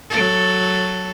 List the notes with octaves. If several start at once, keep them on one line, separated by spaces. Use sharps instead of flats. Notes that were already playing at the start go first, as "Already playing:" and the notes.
F#3 A4